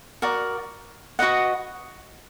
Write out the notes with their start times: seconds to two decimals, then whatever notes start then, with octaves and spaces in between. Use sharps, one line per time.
0.22 F#4 A#4 D5
1.19 F#4 B4 D#5 F#5